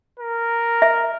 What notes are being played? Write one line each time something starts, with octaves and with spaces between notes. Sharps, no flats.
A#4
E5